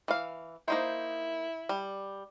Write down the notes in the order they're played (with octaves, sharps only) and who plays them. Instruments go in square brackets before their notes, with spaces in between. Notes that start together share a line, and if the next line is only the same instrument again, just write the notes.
[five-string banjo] E3 F5
[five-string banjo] A#3 D#4 C5 [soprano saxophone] E4
[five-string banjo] G3